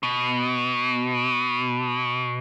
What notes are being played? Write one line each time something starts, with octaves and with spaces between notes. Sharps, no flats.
B2